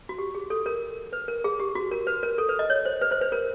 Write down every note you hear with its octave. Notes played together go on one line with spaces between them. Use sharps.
F#4
G4
G#4
A4
A#4
B4
A#4
G#4
G4
F#4
A#4
B4
A#4
A4
B4
D#5
C#5
C5
B4
C5
B4
A#4